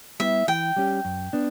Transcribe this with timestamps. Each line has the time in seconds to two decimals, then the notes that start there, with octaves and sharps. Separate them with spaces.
0.20 G3 B3 E4 G4 E5
0.48 E3 G5
0.76 G3 C#4 G4
1.05 F#2
1.33 B3 D4